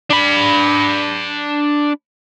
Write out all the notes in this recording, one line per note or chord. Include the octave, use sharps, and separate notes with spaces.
D4 B5